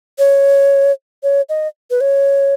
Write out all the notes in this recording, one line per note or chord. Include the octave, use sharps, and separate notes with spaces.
C#5
C#5
D#5
B4
C#5